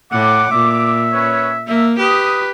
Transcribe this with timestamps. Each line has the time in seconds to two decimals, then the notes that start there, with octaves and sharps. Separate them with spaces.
0.12 A2 F#5 D6
0.51 A#2 E5
1.13 C#4 B4 C#5
1.68 A#3 E5
1.99 G4 B4 D#6